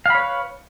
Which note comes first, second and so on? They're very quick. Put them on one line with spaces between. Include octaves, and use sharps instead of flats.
F5 B5 C#5 B4